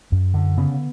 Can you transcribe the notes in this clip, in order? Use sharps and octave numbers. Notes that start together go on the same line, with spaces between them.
F#2
D3
C#3 B3